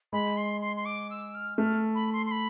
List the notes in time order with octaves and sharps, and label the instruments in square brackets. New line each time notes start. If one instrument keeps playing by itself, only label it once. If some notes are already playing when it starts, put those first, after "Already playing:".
[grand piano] G#3 [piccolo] B5
[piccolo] C6
C6
C6
D6
E6
F6
[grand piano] A3 [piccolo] F6
[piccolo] B5
C6
C6
B5